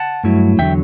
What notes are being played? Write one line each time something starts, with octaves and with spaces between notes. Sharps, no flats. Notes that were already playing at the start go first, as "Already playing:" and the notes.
Already playing: F#5 A5
G2 F#3 A3 E4
E2 D3 F#3 E5 G5